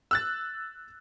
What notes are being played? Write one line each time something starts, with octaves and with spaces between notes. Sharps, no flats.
E6 F#6 A6